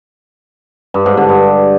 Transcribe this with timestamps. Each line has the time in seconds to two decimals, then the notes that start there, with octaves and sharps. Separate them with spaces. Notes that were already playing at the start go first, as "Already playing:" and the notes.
0.94 G2
1.06 G#2
1.17 D3
1.29 G2